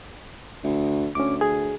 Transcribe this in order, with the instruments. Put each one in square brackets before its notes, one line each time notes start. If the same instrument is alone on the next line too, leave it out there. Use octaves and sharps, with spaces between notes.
[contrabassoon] D2
[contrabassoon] D2 [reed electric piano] C#4 D6
[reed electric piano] G#4